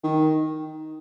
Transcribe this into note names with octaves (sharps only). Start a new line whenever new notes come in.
D#3